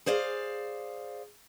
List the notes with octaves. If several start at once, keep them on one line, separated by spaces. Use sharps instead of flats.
G#4 C5 D5 F5